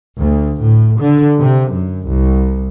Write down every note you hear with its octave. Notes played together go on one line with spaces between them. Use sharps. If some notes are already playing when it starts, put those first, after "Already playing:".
D2
A2
D3
C3
F#2
C2